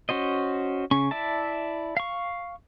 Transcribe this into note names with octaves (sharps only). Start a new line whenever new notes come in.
C#4 F#4 C5 D#5
C#3 C#4 C#6
E4 D5 E5 A5
F5 C#6